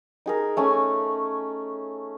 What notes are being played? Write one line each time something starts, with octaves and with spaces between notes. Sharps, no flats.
D#4 G#4 A#4
A3 C#4 G#5